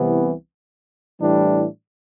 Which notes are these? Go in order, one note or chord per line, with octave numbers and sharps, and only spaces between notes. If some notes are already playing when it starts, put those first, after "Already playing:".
Already playing: C2 C3 E3 B3
A2 E3 G3 D4